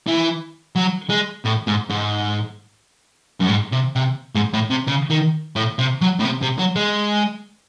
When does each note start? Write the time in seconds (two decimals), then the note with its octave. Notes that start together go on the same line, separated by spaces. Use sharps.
0.07 E3
0.76 F#3
1.10 G#3
1.45 A2
1.67 G#2
1.89 G#2
3.41 F#2
3.49 G#2
3.73 C3
3.96 C3
4.35 G#2
4.53 A2
4.70 C3
4.87 C#3
5.10 D#3
5.56 A2
5.79 C3
6.01 F#3
6.20 A2
6.24 C3
6.42 C3
6.59 F#3
6.76 G#3